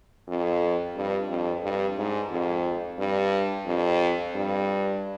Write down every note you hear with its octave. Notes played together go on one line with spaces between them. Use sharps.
F2
G2
F2
G2
G#2
F2
G2
F2
G2